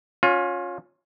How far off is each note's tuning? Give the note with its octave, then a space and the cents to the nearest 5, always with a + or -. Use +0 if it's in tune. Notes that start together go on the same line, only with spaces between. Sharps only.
C#4 +0 F4 +30